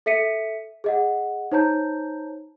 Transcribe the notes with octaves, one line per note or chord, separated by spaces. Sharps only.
A4 E5 B6 C#7 D#7
G#4 D#5 F#5
D#4 C5 C#5 A5 A#5 G6